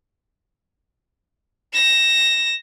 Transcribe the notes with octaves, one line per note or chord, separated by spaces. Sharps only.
A#6 E7